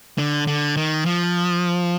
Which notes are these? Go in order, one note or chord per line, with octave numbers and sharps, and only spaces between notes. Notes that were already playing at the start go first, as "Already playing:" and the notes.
D3
D3
D#3
F3